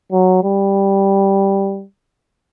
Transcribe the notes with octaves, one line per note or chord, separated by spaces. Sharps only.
F#3
G3